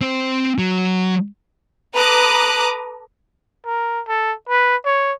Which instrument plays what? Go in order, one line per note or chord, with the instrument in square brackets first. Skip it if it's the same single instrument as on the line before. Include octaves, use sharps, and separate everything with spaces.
[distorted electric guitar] C4 C5
F#3
[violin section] A4 B4 A#5 D6 D#6 F#6
[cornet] A#4
A4
B4
C#5